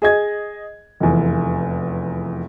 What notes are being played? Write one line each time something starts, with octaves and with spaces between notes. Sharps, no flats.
G#4 D#5 G#6
F1 E2